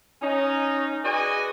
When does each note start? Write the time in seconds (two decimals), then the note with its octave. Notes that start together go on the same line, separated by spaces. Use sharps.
0.22 C#4 D#4
1.04 F#4 G#4 B4 D5 D#5 G#5